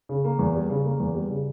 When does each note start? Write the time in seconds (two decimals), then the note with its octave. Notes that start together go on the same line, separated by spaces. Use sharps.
0.09 C#3
0.24 A#3
0.39 E2
0.55 G3
0.69 C#3
0.85 A#3
1.00 E2
1.15 G3
1.30 C#3